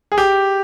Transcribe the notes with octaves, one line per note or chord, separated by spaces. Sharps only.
G#4
G4